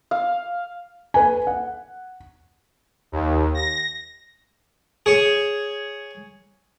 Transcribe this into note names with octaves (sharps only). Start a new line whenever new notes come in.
F5
B4 G#5
F#5
D#2
A#6
G#4 C#5